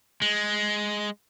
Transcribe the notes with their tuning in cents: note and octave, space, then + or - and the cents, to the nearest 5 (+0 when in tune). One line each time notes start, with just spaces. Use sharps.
G#3 +5